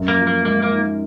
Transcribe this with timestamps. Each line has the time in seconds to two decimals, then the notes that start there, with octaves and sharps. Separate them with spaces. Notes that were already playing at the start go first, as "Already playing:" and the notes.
Already playing: F#2
0.08 A#3
0.17 F3
0.27 A#3
0.45 G#3 A#3
0.62 A#3
0.71 D#4